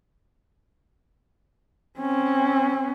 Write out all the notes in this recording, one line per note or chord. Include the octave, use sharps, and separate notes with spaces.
C4 C#4